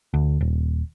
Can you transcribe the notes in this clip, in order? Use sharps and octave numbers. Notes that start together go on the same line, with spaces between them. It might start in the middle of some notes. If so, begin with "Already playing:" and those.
D2
D#1